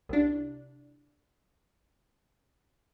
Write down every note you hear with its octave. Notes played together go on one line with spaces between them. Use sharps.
C2 D4